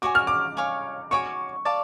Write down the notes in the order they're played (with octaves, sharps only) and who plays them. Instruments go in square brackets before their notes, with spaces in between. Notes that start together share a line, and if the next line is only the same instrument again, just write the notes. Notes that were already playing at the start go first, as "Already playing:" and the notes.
[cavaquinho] F#4 C#5 G#5 [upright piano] D6
[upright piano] F6
D6
[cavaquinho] C#5 F5 G#5 C#6
[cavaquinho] F#4 C#5 G#5 D6 [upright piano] C#6
[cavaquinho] D5 F5 A5